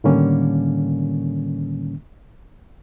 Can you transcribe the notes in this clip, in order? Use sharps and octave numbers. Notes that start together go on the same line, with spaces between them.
A2 D3 D#3 G3 A#3 C#4